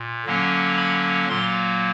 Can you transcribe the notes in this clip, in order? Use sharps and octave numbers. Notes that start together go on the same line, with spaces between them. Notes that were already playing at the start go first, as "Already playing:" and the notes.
Already playing: A#2
D3 F#3 A#3 C#4
B5
A#2 F#3 A#3 C6